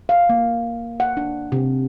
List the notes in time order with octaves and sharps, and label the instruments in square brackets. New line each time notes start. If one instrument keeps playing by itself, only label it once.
[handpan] F5
A#3
F#5
D4
C3